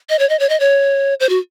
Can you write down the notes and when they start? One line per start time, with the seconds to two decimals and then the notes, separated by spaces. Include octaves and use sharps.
0.10 D#5
0.19 C#5
0.29 D#5
0.40 C#5
0.49 D#5
0.60 C#5
1.20 C5
1.29 F#4